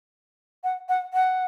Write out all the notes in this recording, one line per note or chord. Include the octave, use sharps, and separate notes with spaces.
F#5
F#5
F#5